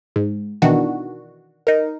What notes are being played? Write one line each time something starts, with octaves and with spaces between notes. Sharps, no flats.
G#2
B2 D#3 E3 D4 F#4
D#4 A#4